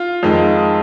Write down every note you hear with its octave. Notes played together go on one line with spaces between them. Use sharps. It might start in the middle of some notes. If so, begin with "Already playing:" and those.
Already playing: F4 F5
F2 D#3 G#3